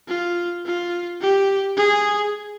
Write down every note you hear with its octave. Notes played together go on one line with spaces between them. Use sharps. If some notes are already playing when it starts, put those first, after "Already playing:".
F4
F4
G4
G#4